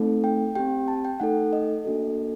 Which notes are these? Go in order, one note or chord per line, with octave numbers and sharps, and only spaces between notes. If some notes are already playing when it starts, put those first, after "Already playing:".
Already playing: A3 C4 D#4 A4
G5
C4 G4 G5
A5
G5
A3 D#4 A4 F#5
D#5
A#3 D4 F#4 A4